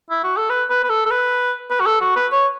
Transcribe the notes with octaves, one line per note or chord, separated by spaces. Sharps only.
E4
F#4
A4
B4
B4
B4
A4
A4
B4
B4
F#4
A4
F#4
B4
C#5